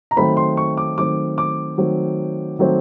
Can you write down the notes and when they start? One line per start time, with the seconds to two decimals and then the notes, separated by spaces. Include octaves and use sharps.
0.11 A#5
0.16 D#3 F#3 A3 C4 B5
0.37 C6
0.57 C#6
0.77 D6
0.98 D#3 F#3 A3 C4 D6
1.38 D6
1.78 D#3 F#3 A3 C4
2.59 D#3 F#3 A3 C4